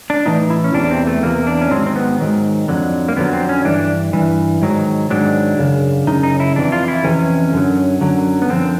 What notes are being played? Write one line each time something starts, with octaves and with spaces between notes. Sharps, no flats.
D4
A2 E3 D#4
E4
C#4
E2 C3 E3 D4
C4
A3
E2 C3 E3 A#3
D4
C#4
G#2 D#3 F#3 C4
C4
B3
G#2 D#3 F#3
F2 D3 F#3
A#3
F2 D3 F#3 B3
C4
C#4
G2 E3 D4
G2 E3
G#2 D#3 F#3
G#2 D#3 F#3 D4
F#2 C#3
F#2 C#3 D#4
D#4
E4
F2 C3 E3 D4
F4
E4
F2 C3 E3 C#4
F#2 D3 F#3
F#2 D3 F#3
B3
F#2 D3 F3 C4